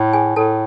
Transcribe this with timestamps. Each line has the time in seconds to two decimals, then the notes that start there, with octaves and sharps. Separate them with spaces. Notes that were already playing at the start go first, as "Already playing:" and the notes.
Already playing: A2
0.13 G#4 G#5
0.36 A2 A4 A5